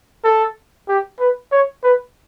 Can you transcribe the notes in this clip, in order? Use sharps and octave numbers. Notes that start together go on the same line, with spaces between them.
A4
G4
B4
C#5
B4